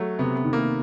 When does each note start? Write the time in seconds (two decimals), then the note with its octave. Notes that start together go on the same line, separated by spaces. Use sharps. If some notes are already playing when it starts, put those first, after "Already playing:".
Already playing: F#3 A3
0.19 C3 B3
0.36 B3
0.45 D#3
0.53 A#3